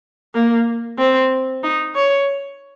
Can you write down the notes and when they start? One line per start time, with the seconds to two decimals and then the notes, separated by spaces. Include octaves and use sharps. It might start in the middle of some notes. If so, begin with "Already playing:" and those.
0.34 A#3
0.98 C4
1.63 D#4
1.95 C#5